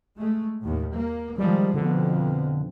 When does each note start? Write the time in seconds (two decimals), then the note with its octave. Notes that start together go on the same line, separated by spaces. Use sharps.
0.17 G#3 A3
0.61 D#2 A2
0.93 A#3
1.38 D#3 F3 G3 G#3
1.74 F2 B2 D3